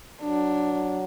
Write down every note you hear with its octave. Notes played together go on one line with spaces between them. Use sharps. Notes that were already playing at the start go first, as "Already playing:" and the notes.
F#3 D4